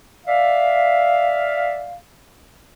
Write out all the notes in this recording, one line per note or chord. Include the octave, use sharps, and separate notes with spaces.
D5 E5 F5